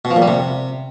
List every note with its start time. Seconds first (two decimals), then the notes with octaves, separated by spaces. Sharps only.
0.05 B2
0.11 F3
0.16 A#2
0.22 G3
0.28 C3